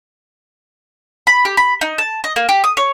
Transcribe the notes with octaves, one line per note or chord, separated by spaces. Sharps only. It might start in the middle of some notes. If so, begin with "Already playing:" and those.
B5
G4
B5
D#4
A5
D#5
A#3
G4
D#6
C#5